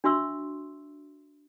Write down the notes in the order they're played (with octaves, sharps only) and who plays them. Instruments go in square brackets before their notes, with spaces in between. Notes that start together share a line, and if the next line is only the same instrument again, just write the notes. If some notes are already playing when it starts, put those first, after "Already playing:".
[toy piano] D4 F#4 E5 C6 C#6 E6